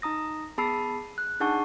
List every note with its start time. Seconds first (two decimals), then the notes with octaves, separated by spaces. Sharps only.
0.02 D#4 A#5 D#6 A#6
0.58 B3 G#4 A5 B5 E6 C7
1.18 F#6
1.40 D4 D#4 G#4 F#5 A5 C#6